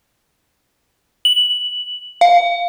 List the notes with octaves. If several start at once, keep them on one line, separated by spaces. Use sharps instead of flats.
F#7
F5